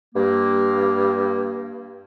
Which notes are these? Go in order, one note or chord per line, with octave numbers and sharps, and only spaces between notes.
G2 A#3